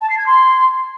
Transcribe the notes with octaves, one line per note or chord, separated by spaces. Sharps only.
A5
C7
G#6
C6